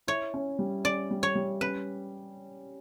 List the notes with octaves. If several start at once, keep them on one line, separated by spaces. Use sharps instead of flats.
E4 C#5
C#4
G3
C#4 D5
G3
C#5
G3
C#4 B4